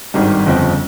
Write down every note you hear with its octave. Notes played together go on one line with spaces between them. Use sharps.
G#1 G2 D#3
G1 F2 C#3 F3 C4